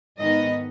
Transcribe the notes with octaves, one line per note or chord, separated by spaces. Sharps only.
G#2 D#3 B3 D#4 D#5